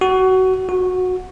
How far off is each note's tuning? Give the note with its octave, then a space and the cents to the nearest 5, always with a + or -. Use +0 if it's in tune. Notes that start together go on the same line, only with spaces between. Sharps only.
F#4 +20
F#4 -15